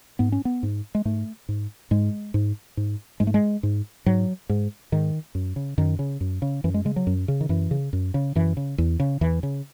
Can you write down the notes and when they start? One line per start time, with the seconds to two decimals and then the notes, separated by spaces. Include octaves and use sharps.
0.19 G#2 B3
0.32 C#4
0.45 B3
0.63 G#2
0.95 G#3
1.05 G#2 A3
1.49 G#2
1.91 G#2 G#3
2.34 G#2
2.77 G#2
3.20 G#2 G#3
3.27 A3
3.34 G#3
3.63 G#2
4.06 G#2 F#3
4.49 G#2
4.92 G#2 D#3
5.35 F#2
5.56 C#3
5.78 F#2 D#3
5.99 C#3
6.21 F#2
6.42 C#3
6.64 F#2 E3
6.74 G#3
6.85 C#3 G#3
6.96 F#3
7.07 F#2
7.28 C#3
7.41 D#3
7.49 F#2 E3
7.71 C#3
7.93 F#2
8.14 C#3
8.35 F#2 E3
8.57 C#3
8.78 E2
9.00 C#3
9.21 E2 E3
9.43 C#3